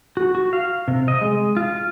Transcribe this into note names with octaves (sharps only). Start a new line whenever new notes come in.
F#4
F#4
F5
C3
D#5
G#3
F4